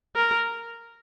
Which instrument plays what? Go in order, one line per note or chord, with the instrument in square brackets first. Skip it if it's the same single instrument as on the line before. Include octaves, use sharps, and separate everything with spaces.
[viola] A#4